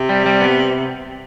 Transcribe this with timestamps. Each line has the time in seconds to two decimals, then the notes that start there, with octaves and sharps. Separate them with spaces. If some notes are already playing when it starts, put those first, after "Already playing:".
Already playing: C3
0.09 G3
0.26 G3
0.41 B3